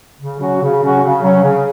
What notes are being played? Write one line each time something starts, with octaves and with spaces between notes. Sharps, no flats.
C#3
F#3 C#4 F#4
C#3
F#3 C#4 F#4
C#3
F#3 C#4
C#3